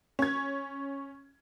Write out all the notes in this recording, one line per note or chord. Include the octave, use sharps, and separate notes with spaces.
C#4 G#6